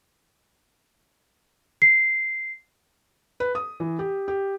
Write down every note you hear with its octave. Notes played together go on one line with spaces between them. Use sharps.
C7
B4
D#6
E3
G4
G4